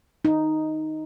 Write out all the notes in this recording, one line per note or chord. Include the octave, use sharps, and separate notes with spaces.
D#4